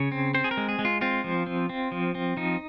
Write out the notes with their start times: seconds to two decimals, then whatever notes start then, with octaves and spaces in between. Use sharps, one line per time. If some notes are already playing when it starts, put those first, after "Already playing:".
Already playing: C#3 C#5
0.12 C4
0.34 C4 C5
0.44 G#4
0.51 A#4
0.57 G#3
0.69 G#4
0.79 G#3
0.85 F4
1.01 C4 F4
1.24 F3
1.47 C4
1.69 C4
1.92 F3
2.15 C4
2.37 F3 D#4